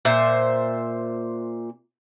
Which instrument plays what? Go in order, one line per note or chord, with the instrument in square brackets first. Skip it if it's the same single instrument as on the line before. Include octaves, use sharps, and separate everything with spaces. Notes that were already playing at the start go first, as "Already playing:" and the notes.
[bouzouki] A#2 C5 E5